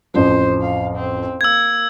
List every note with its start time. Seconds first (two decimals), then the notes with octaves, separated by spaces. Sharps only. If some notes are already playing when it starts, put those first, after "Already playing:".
0.14 A1 F2 F3 C5
0.62 F5
0.96 C4
1.41 A#3 E6 G#6